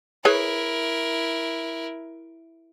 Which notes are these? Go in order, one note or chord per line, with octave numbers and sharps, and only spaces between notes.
E4 G#4 A#4 B4 C#5